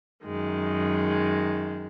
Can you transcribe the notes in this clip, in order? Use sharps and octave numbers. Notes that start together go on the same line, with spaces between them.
F#2 D#3 G#3